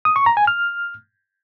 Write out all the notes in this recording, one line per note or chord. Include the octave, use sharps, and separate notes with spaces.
D#6
C#6
A#5
G#5
F6